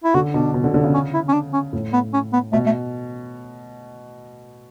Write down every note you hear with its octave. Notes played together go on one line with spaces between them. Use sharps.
E4
D3 F#4
B2 D4
B2
D3
D3
C#3
C#4
E4
C#4
D4
C#4
A2
B3
C#4
B3
B2 A3
A3